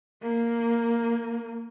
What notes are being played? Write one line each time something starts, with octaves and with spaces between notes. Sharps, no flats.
A#3